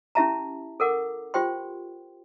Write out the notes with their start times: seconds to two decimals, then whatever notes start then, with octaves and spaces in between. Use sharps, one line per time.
0.15 C#4 E4 G4 E5 A5 A#5
0.80 A4 A#4 F#5 D6
1.34 F4 G4 C5 G5 C6